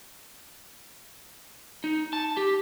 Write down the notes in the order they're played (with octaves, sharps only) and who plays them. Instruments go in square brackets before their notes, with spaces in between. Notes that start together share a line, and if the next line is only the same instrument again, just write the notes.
[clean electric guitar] D#4
A5
G4